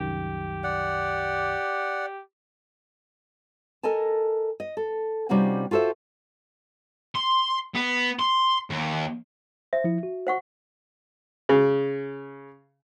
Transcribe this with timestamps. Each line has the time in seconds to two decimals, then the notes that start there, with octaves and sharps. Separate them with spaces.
0.01 C2 F#2 D#3 G4
0.64 D5 F#5
3.83 A4 A#4 D#5 G#5 A5
4.60 D#5
4.77 A4
5.29 C3 G3 C#4 D#4 F4 F#4
5.71 F4 F#4 A4 C5 E5
7.15 C6
7.75 B3
8.19 C6
8.70 D#2
9.73 C5 E5
9.84 F3 E4
10.03 F#4
10.27 C5 F#5 C#6
11.49 C#3